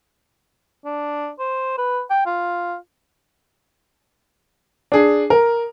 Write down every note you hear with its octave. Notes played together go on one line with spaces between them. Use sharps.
D4
C5
B4
G5
F4
D4 G#4
A#4